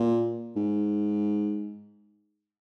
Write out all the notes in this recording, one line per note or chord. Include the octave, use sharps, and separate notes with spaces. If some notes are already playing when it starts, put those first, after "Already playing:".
Already playing: A#2
G#2